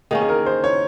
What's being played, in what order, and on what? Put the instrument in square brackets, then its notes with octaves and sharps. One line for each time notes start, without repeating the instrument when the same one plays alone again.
[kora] D#3 A#3 C#4 [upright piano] G#4
[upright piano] G#4
A#4
C5
C#5